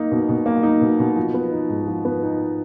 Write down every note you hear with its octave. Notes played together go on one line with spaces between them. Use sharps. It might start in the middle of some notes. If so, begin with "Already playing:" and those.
Already playing: A#3 D#4
B2
B2
A#3
D#4
B2
B2
F3
B3
D#4
G#2
F3
B3
D#4